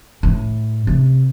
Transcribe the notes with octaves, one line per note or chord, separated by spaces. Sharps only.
A2
C3